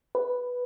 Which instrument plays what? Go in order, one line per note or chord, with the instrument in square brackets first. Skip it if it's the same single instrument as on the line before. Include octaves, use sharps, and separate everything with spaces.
[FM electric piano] B4